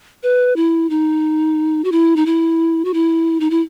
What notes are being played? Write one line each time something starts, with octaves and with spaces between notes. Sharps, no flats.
B4
E4
D#4
F#4
E4
D#4
E4
F#4
E4
D#4
E4